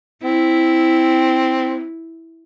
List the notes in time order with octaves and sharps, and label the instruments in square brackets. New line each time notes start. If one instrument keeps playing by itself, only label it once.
[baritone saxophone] C4 [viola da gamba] E4